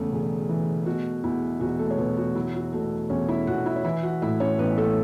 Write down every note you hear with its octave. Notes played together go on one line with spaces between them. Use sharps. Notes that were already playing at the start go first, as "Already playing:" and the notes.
Already playing: E2 C#3 A3
E1
E3
B2 F#4
E2 E4
E1 F#4
A3 A4
C#5
E1 B3 B4
F#4
F#3 E4
F#4
B2 A3 A4
E2 C#4 C#5
E4 E5
E2 F#4 F#5
E4 E5
C#5
E3 E4 E5
F#4 F#5
A2 E4 E5
C#4 C#5
A1 B3 B4
A3 A4